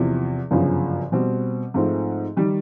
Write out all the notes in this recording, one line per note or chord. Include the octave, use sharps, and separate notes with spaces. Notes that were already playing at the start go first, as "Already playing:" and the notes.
Already playing: E2 C3 F3
G1 F#2 C#3 F3
B2 G3 C4
G#2 F3 A3 C4
D#3 G3